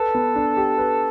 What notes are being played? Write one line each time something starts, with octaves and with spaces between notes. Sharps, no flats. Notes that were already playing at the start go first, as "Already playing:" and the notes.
Already playing: A4 B4
B3
D4
G4
B4